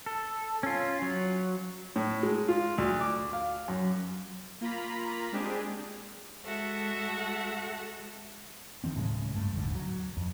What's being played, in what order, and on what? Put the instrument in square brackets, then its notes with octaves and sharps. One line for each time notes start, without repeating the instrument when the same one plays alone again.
[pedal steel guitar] A4
C#4 F4
F#3
[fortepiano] A2
G#3
F4
D2
D6
F5
F#2
[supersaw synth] A#3 F4 A#5 B5 B6
G#3 C4 D4 G4 G#4
[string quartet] G#3 F#4 A4 E5 F#5
[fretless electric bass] D#3 E3 G#3 C4
D1 A2 C#3 G#3
G2 A3
D#1 A1 G#2 D3
F#3
F2